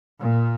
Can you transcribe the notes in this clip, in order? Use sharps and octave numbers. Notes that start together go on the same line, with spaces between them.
A#2